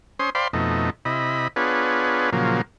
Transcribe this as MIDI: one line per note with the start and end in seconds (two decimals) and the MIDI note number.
0.19 0.30 61
0.19 0.30 72
0.19 0.30 84
0.19 0.30 87
0.35 0.48 72
0.35 0.48 74
0.35 0.48 77
0.35 0.48 79
0.35 0.48 83
0.35 0.48 84
0.53 0.90 41
0.53 0.90 47
0.53 0.90 57
0.53 0.90 63
1.05 1.48 48
1.05 1.48 64
1.05 1.48 75
1.05 1.48 83
1.56 2.30 59
1.56 2.30 62
1.56 2.30 65
1.56 2.30 68
1.56 2.30 71
1.56 2.30 73
2.33 2.62 46
2.33 2.62 49
2.33 2.62 53
2.33 2.62 54
2.33 2.62 58